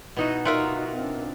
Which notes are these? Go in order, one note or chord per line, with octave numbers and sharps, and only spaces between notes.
B2 D#4 E4 F#4 D#5
D#4 F4 F#4 A#4 E5 F#5
C4 D4